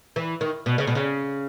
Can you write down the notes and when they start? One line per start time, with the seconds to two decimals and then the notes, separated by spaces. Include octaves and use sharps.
0.16 E3
0.41 D#3
0.66 B2
0.78 C#3
0.87 B2
0.95 C#3